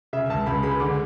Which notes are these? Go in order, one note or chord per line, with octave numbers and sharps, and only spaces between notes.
C#3 E5
C#2 A5
C#2 B5
G#3 B5
D3 D6